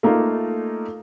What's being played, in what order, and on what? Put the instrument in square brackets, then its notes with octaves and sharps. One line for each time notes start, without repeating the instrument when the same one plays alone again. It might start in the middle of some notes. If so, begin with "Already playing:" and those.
[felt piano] A3 A#3 D#4 F4